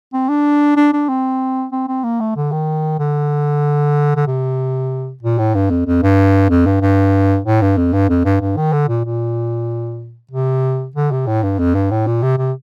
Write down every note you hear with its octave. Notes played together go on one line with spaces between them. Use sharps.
C4
D4
D4
D4
C4
C4
C4
A#3
A3
D3
D#3
D3
D3
C3
A#2
A2
G2
F2
F2
G2
F2
G2
G2
A2
G2
F2
G2
F2
G2
G2
D#3
D3
A#2
A#2
C3
D3
C3
A2
G2
F2
G2
A2
A#2
C3
C3